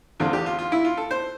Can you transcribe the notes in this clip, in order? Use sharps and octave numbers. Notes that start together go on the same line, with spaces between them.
E2 D3 A3 C4 F4
G4
F4
F4
E4
F4
A4
C5